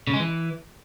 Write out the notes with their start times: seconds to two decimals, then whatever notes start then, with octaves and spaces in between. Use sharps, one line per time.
0.07 C#3
0.14 G#3
0.20 E3